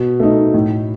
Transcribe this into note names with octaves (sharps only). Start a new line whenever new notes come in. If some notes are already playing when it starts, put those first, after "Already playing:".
Already playing: B2
A3 D#4
A2